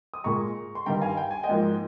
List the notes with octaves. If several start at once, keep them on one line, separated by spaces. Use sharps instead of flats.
D#6
A#2 G#3 A#5 C#6
C6
G2 D#3 G3 G5 A#5
F5 G#5
G5
G#5
D#5 G5
G#2 F3 A#3